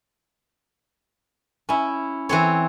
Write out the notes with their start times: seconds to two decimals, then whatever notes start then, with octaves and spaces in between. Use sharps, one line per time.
1.69 C#4 E4
2.29 E3 C4 C#5